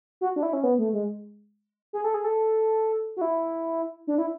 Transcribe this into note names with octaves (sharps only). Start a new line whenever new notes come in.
F#4
D4
E4
C#4
B3
A3
G#3
G#4
A4
G#4
A4
F#4
E4
D4
E4